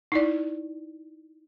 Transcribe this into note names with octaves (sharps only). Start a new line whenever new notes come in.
D#4 E4 D5